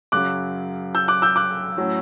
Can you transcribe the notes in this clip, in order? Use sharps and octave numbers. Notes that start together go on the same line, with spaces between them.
F#2 C#3 F#3 D6 F#6
E6 G6
D6 F#6
E6 G6
D6 F#6
A2 F#3 C#4